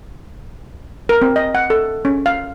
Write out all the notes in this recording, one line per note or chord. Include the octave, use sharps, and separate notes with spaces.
A#4
C4
D#5
F#5
A4
C#4
F5